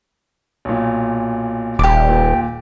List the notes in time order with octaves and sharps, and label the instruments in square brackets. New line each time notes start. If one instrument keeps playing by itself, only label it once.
[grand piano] B1 A#2
[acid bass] D#1 [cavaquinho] G4 D6
[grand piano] A#2